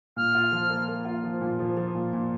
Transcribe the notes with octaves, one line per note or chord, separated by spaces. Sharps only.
A#2 F6
F4
F3
A#3
A#3
F4
F3
A#2
F3
F3
A#2
A#2